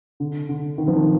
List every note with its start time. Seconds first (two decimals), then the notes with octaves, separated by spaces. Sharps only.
0.20 D3
0.49 D3
0.78 D#3
0.87 F3
0.96 D#3